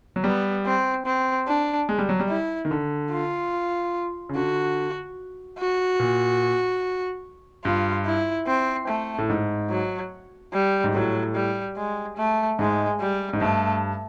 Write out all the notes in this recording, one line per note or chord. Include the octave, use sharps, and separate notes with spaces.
F#3
G3 B3
C4
C4
D4
G#3
G3
F#3
G3
E4
D#3
D3
F4
C#3
D3 F#4
F#4
A#2
G2 F4
E4
C4
A3
A2
G#2
F#3
G3
G#2
A2 F#3
G3
G#3
A3
G#2 G#3
G3
G#2
G2 A3